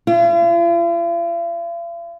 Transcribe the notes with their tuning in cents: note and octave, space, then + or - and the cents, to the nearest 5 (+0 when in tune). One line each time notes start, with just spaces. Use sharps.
F4 -45